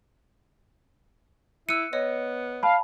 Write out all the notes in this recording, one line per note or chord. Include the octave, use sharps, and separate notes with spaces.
E4 E6 F#6 C#7 D#7
B3 C#5 D#5
F5 A5 B5